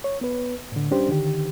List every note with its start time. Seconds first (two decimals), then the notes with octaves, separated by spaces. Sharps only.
0.04 C#5
0.21 B3 B4
0.72 A2 D3
0.91 G3 C#4 D4 G4 C5
1.09 D3 D#3 G4